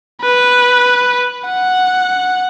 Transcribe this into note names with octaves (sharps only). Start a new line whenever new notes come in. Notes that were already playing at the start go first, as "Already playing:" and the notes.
B4
F#5